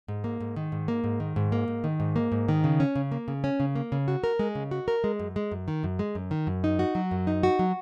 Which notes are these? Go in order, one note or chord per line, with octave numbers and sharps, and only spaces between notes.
G#2
A#3
G#2
D#3
G#2
A#3
G#2
D#3
G#2
A#3
G#2
D#3
G#2
A#3
G#2
D#3
C#3
C#4
C#3
A#3
C#3
C#4
C#3
A#3
C#3
F#4
A#4
G#3
C#3
F#4
A#4
G#3
F#2
G#3
F#2
D#3
F#2
G#3
F#2
D#3
F#2
D#4
F#4
F#3
F#2
D#4
F#4
F#3